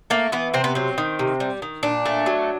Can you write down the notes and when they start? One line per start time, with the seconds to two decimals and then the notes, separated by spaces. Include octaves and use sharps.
0.10 A3 A#3
0.32 E3 B3
0.54 C3 C4
0.64 B3
0.75 F#3 C4
0.98 D#3
1.19 C3
1.40 G3
1.62 D#3
1.83 A#2 D4
2.06 A3
2.26 F#3